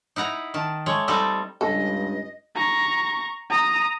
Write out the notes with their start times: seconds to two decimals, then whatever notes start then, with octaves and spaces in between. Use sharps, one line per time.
0.16 D#4 E4 F#5 A#5
0.54 D#3 A5
0.86 G#3 A3 C#5
1.08 G3 C4 D#4 A4
1.61 C#2 G2 A4 D#5
2.55 A#5 C#6
3.50 A#5 D#6